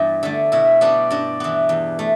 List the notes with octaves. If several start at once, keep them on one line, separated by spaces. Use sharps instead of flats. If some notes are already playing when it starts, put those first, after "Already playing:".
Already playing: G2 E3 G3 B3
D3 A3
B2 E4
G3 B3 D4
G2 D4
E3 B3
E2
A3